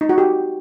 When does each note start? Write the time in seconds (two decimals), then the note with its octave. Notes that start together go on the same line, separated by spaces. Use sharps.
0.01 D#4
0.09 F#4
0.18 G4